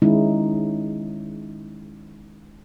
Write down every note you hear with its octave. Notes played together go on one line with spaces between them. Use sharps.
D#3 G#3 C#4 D#4 E4